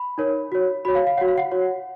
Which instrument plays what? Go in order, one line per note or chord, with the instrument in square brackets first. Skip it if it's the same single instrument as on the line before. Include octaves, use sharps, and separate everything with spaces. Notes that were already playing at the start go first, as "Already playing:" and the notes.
Already playing: [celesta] B5
D#4 A#4 C#5
F#4 C#5
F#4 C#5 B5
F5
F5
F#4 C#5 F#5
F5
F#5
F#4 C#5